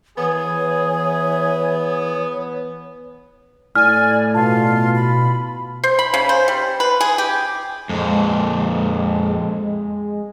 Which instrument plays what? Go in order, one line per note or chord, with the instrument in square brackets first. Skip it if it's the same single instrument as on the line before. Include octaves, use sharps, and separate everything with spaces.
[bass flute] E3 [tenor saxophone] B3 [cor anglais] G#4 [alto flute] C#5
[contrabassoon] A2 [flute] D5 [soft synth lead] G#5 [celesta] F6
[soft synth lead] B2 [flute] F4 [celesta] A5
[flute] B5
[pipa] C5
B5
C#3
C5
G3
B4
G#4
G4
[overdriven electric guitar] F2 A#2 [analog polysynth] G#3